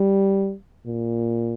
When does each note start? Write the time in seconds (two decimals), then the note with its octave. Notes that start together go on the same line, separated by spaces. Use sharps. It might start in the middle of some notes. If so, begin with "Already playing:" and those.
Already playing: G3
0.86 A#2